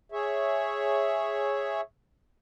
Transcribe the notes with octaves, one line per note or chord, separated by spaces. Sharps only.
G#4 C#5 E5